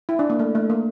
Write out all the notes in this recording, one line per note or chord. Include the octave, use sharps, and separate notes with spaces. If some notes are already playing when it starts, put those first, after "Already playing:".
E4
D4
A#3
A3
A3
A#3